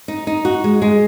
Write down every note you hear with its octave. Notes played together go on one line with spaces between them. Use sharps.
D#4
D#4
F#4
G#3
G#3